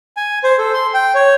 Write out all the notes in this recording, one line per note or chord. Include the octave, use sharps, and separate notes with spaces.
G#5
C5
A4
C6
G5
C#5